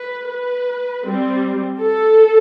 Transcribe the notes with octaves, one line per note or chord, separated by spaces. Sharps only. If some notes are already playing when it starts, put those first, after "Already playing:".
Already playing: B4
B4
G3 C4
A4